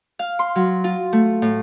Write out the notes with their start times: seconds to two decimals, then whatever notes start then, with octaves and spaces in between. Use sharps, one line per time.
0.19 F5
0.39 C6
0.56 F#3
0.84 F4
1.13 A3
1.42 A2